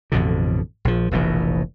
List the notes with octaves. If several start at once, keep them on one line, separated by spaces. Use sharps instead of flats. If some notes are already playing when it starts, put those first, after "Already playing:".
A1 F2 B2 D3
A#1 F3
F1 A#1 B2 E3